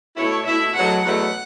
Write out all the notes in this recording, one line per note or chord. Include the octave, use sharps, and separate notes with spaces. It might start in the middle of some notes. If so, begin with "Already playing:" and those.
B2 A3 E4 C#5
B2 A3 E4 E5
E2 B2 F#3 A3 F#5
E2 B2 F#3 A3 F#5